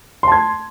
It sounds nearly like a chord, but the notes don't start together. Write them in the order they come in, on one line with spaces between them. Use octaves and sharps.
C6 A5 G#6